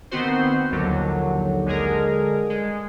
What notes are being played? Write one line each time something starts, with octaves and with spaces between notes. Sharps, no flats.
D#3 B3 C4 F#4 C5
A#1 D#2 D3 F#3
D3 G#3 G#4 A#4
G#3